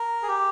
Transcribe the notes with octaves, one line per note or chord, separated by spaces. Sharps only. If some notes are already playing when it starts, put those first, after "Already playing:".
Already playing: A#4
G#4
G4